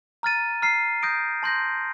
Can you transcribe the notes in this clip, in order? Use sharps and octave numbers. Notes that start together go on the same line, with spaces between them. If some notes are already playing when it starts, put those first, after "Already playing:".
A#5 F6 A6 D#7
A#5 F6 C7
D#6 G6 A#6 D7
A5 C6 G6 A#6